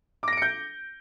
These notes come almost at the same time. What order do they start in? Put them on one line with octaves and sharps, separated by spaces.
D6 A#6 D7 C#7 G6